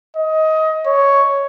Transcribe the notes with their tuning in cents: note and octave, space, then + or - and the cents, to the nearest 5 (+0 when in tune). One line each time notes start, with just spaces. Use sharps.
D#5 +20
C#5 +5